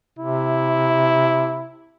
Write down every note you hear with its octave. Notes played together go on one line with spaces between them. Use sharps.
C3 E4